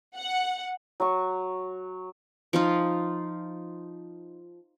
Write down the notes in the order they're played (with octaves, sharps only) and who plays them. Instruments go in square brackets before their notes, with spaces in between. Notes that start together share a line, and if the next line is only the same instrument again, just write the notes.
[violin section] F#5
[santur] F#3 C#6
[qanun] F3 D#4 F4